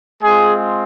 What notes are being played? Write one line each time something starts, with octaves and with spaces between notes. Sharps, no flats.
G#3 C4 F4 G#4